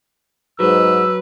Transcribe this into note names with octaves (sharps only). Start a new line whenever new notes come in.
G#2 F#3 B4 E6